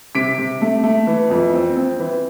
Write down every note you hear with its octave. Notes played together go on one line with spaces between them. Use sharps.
C3 B6 D7
C3
A3
A3
E3
F2
C4
C4
E3